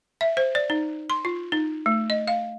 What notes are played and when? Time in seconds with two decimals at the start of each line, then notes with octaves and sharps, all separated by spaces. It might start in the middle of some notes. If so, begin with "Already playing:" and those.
0.21 E5
0.37 C5
0.55 D5
0.70 D#4
1.10 C6
1.25 F4
1.52 D#4
1.86 A3
2.10 D#5
2.28 F5